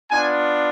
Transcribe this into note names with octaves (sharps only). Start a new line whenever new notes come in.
B3 D4 F4 G#5